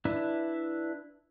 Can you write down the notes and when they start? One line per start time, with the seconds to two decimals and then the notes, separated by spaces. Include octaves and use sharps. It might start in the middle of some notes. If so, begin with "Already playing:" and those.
0.05 D4 E4 B4